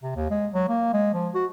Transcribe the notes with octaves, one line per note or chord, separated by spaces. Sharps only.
C3
D#2
G#3
F#3
A#3
G#3
F3
F#4